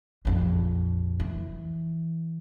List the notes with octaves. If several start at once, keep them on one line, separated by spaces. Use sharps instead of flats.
A#1 F2
E3